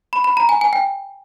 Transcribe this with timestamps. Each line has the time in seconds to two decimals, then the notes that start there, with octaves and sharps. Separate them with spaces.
0.13 B5
0.24 B5
0.37 A#5
0.49 G#5
0.61 G#5
0.73 G5